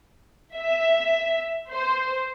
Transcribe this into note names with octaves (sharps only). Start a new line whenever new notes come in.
E5
C5